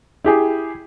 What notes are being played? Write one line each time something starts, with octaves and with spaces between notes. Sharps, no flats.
E4 G4 G#4